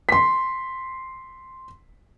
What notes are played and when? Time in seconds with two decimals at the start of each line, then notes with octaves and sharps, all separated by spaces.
0.09 C6 B6